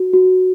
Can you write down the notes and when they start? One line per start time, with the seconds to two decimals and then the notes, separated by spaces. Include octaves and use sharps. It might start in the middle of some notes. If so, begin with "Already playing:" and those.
Already playing: F#4
0.13 F#4